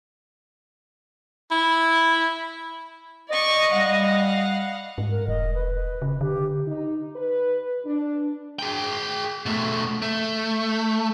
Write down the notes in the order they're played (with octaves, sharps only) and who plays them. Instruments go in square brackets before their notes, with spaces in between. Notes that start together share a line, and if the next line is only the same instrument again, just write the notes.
[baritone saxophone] E4
[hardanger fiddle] D5 C#6 [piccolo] D#5
[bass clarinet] G3 [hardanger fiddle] F5 F#5
[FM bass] G#2
[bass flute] A#4
[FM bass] E1 [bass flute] D#5
[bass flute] B4
[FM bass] C#3
[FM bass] D3 [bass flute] G4
[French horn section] D#4
B4
D4
[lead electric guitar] G#4 G5
B2 A3
A3